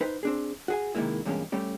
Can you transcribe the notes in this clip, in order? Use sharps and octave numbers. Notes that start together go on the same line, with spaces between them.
D#4 B4 C5
C4 D4 G#4
F#4 G#4 G#5
C3 D#3 E3 G#3 A#3 E4
E2 G2 A#2 G#3 A#3 C#4
G3 A3 C#4 G4